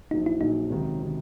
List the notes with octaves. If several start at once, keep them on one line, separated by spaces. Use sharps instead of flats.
A#1 A#2 F#3 D#4
E4
A#1 A#2 F#3 D#4
C#2 C3 D#3 F#3
C3 D#3 F#3